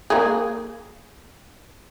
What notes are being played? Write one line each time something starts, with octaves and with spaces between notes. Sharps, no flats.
A#3 G#4